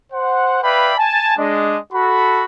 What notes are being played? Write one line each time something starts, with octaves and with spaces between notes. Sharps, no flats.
C5 F#5
B4 D5 E5 F5 G5 B5
G#5 A5
G#3 D4 D#5
F#4 A4 B5